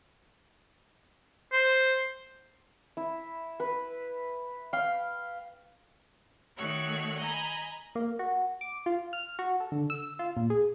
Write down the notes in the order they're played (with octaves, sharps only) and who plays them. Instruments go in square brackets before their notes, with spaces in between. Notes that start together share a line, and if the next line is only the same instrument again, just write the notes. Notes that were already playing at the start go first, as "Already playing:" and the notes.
[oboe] C5
[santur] E4
B4
F5 G5
[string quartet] D#3 A3 F#4 C#5 F#6
D#5 G#5 A#5 B5
[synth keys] A#3
F#4
D6
F4
F6
F#4
A4
D3
E6
F4
A#2
G#4